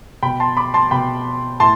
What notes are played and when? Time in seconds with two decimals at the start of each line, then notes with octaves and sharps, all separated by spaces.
0.23 B2 G5 B5
0.40 A5 C6
0.57 B5 D6
0.74 A5 C6
0.91 B2 G5 B5
1.60 A2 A5 C6